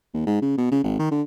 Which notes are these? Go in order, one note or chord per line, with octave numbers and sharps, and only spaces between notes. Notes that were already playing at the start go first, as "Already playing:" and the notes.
D#2
G#2
C#3
B2
C#3
G#1
D#3
D3